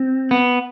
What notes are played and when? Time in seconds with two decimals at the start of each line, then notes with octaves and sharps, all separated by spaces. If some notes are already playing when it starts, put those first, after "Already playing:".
Already playing: C4
0.31 B3